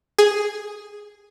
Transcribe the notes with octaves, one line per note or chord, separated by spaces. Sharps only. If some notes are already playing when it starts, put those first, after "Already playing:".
G#4